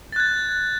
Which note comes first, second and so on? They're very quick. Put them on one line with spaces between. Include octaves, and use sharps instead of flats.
A6 F#6 G#6